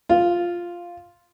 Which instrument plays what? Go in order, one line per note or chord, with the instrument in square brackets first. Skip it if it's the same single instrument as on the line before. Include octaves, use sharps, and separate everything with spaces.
[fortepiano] F4